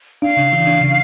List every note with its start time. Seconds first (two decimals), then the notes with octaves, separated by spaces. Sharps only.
0.22 D4 F5
0.37 C#3
0.53 E3
0.67 D4
0.81 C#3